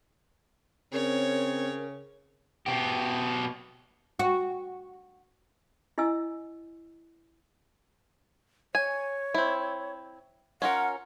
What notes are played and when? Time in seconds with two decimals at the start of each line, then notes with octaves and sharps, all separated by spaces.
0.93 C#3 C4 A#4 C#5
2.66 B2 G4
4.19 F#4
5.98 E4 D#5 G#5 E6
8.75 C#5 G#5
9.34 C4 E4
10.62 C#4 F4 A#4 F#5